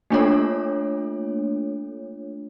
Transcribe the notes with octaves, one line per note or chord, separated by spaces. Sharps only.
A3 A#3 D4 F4 A4 C#5